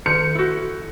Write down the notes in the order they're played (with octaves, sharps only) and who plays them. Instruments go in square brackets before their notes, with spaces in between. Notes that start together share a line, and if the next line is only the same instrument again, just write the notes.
[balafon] D#3 [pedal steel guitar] A4 F6 G6 [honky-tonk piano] C#7
[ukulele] E4 F#4